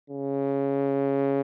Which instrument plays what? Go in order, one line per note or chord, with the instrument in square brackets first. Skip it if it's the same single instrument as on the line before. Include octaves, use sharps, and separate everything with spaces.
[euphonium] C#3